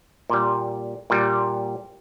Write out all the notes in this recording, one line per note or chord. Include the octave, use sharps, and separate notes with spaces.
A#2 G3
A#2 G3